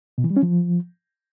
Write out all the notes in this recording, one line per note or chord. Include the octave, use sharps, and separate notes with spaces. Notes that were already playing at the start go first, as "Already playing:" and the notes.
B2
E3
G3
C#4
F3